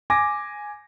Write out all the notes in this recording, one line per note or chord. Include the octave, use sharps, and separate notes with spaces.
G#5 D6 A#6